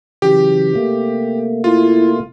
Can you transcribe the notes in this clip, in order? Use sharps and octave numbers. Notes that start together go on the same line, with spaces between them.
C#3 E3 F#3 G4
C3 A3 A#3
E4 F4